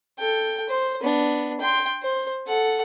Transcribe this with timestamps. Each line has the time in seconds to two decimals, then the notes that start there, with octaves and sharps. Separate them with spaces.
0.19 A4 G5
0.69 C5
1.01 B3 D4
1.61 G5 C6
2.02 C5
2.47 A4 F#5